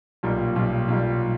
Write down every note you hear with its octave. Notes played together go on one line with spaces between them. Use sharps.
B1 A#2 G3
B1 A#2 G3
B1 A#2 G3